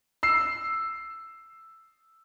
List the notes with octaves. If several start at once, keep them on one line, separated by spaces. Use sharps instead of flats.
E6 C7